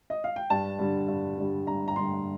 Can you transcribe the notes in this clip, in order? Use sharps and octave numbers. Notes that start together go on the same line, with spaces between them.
D#5
F5
G5
G2 A5
D3 G3
G2
D3 G3
G2 A#5
A#5
D3 G3 C6